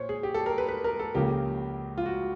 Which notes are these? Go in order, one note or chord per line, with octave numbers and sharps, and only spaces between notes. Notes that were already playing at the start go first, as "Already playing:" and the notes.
Already playing: A#2 C5 C#5
G#4
G4
A4
A#4
B4
B4
A#4
A4
C#2 C#3 F3 A#3 G4
F4
F#4